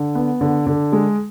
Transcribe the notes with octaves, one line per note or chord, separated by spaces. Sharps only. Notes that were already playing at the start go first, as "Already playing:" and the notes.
Already playing: D3
B3
D3
D3
G#3